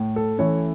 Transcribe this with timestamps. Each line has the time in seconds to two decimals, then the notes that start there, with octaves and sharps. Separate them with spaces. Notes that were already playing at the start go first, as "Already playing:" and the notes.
Already playing: A2
0.16 A4
0.38 E3 A3 C#4 C#5